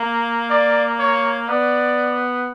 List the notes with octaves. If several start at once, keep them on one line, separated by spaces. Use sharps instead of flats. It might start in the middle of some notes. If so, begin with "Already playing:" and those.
Already playing: A#3
D5
C#5
B3 D5